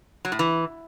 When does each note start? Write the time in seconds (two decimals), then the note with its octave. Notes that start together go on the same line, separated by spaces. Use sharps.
0.25 F#3
0.32 A2
0.39 E3